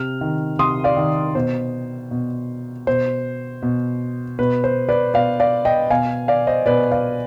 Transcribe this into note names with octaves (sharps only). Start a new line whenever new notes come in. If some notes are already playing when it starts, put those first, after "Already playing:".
Already playing: C3 F6
D#3
C3 C6 D#6
D5 F5
D#3
B2 C5
B2
B2 C5
B2
B2 B4
C5
B4 D5
B2 D5 F5
D5 F5
D#5 G5
B2 F5 G#5
D5 F5
C5 D#5
B2 B4 D5
D5 F5